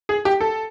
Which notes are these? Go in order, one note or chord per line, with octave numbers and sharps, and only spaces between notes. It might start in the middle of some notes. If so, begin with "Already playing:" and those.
G#4
G4
A4